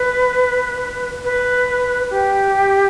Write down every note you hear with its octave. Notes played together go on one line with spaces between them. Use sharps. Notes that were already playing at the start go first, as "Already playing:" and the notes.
Already playing: B4
B4
G4